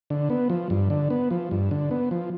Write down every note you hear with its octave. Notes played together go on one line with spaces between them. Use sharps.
D3
B3
F3
G2
D3
B3
F3
G2
D3
B3
F3